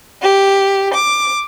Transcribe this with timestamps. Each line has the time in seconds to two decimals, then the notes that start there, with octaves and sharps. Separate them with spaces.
0.21 G4
0.94 D6